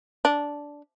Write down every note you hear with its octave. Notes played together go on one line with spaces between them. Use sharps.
D4